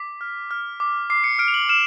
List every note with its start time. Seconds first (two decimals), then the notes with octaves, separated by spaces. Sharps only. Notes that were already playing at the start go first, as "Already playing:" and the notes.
Already playing: D6 B6
0.21 F6
0.51 F6
0.80 D6
1.10 D6 C7
1.24 C#7
1.39 F6 D7
1.48 F7
1.54 F#7
1.69 F6 E7